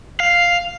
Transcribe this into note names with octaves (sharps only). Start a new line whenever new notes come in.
F5